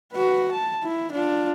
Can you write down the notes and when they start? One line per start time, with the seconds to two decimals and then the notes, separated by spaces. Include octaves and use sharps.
0.12 F#4 B4
0.51 A5
0.83 E4
1.12 D4 F4